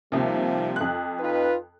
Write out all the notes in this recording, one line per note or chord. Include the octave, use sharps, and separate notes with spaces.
D#2 C3 F3 G3
F2 F#6
D#4 F4 B4